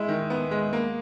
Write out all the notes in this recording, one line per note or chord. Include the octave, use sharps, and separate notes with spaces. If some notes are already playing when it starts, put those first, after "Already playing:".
Already playing: G#3 E4
D#3
B3
G#3
A#3